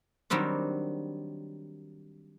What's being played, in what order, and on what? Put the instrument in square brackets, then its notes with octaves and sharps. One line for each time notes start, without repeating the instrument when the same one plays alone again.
[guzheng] D#3 F#3 G3 C4 D4